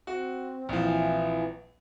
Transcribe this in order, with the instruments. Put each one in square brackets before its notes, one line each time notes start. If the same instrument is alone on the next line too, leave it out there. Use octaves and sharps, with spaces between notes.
[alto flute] C4 [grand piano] F#4
[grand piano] A#1 F3 [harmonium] E3